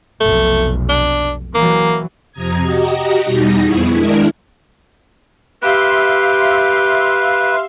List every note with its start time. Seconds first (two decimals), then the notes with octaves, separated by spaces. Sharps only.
0.21 F1 B1 A3
0.89 D4
1.55 E3 F#3 A#3
2.32 F2 C3 A#5 D#6 G#6
2.62 F#4 G4 D#5 A#5 D#6
3.23 E2 B2 G3 D#4 A#6
3.60 F2 B3 E4 G#4 C#6
3.93 D#3 G#3 D4 E4 A#4
5.62 G4 B4 E5 F5 C6